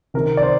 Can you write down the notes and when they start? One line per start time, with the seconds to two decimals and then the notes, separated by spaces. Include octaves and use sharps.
0.14 C3 D#3 A#4
0.37 D5
0.43 C5